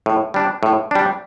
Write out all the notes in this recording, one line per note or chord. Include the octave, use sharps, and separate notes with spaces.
A2
G3 D4
A2
G3 D4